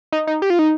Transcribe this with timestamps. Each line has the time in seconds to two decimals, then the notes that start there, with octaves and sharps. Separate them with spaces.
0.12 D#4
0.27 D#4
0.42 G4
0.50 F4
0.59 D#4